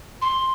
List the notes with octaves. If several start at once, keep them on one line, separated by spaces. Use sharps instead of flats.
C6